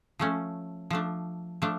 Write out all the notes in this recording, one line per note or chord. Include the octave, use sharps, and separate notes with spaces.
F3 A3 C#4
F3 A3 D4
F3 A3 D4